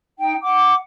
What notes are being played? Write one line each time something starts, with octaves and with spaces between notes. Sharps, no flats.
D#4 G5
F#5 D6